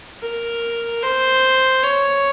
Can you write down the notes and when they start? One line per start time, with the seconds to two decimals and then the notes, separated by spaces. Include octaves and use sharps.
0.22 A#4
1.03 C5
1.83 C#5